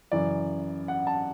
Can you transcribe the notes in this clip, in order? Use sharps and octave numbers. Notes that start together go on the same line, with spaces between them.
F#2 C#3 E3 D5
F#5
A5